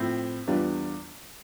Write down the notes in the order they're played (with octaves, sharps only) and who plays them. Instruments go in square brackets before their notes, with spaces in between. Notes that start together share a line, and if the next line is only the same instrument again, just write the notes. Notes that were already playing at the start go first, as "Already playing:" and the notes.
Already playing: [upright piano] A2 F3 C4 E4
E2 E3 G3 D4 F4